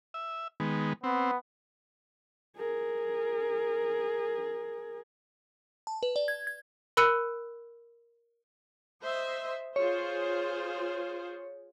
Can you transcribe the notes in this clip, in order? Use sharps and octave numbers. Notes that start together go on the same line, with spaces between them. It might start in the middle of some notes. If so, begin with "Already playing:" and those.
E5
D#3 G#3 B3
B3 C4
G#4 A#4
A5
B4
D5
G#6
G#6
A#4 B5 E6 F#6 C#7 D#7
C5 D#5 E5
F4 G#4 C5 C#5